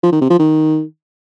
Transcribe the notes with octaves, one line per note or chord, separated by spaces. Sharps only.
F3
D#3
C3
F3
D#3